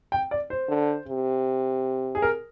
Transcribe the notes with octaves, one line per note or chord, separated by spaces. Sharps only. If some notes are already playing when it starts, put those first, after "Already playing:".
G5
D5
C5
D3
C3
G#4
A#4